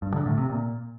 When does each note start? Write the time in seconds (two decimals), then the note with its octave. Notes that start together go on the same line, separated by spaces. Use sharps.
0.02 G2
0.14 D3
0.26 A2
0.38 C3
0.49 A#2